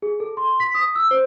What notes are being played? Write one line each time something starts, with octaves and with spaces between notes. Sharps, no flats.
G#4
A4
C6
B6
D#6
E6
C5